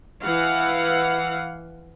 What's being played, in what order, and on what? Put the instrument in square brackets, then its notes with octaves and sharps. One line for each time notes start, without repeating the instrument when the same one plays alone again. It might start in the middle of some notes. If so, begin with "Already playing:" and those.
[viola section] E3 F5 F#5